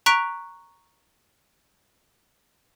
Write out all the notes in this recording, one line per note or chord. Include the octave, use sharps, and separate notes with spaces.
A#5 C#6 F#6 B6 D7 F7